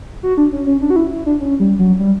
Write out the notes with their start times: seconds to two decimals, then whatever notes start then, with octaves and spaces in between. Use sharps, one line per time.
0.23 F#4
0.37 D4
0.52 C#4
0.67 C#4
0.82 D4
0.90 F#4
0.96 E4
1.11 E4
1.26 D4
1.41 C#4
1.60 G3
1.79 F#3
1.99 G3